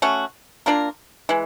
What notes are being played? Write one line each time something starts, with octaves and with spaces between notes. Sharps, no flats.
A3 C#4 F#4
A#3 D4 F4 A#4
E3 G#3